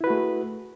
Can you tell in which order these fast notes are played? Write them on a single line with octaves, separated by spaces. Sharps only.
E4 B4 F#4 A3 G#4